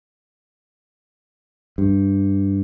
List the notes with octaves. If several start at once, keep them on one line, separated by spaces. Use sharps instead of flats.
G2